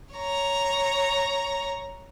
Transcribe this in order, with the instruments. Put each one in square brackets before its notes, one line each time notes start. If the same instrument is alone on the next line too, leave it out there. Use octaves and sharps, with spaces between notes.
[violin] C#5 A#5